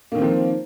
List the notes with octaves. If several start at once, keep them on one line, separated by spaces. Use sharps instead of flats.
D#3 F3 A#3 C4